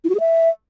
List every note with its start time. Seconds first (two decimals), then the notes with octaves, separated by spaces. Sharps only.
0.04 E4
0.09 F#4
0.15 G#4
0.20 E5